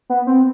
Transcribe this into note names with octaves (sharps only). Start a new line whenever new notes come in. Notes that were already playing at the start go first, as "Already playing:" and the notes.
B3
C4